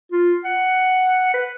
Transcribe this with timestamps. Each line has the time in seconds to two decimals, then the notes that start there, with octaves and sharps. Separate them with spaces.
0.12 F4
0.44 F#5
1.34 B4